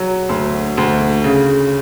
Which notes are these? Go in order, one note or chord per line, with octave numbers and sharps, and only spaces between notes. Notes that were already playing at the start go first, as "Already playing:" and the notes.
Already playing: F#3
D2
D2
C#3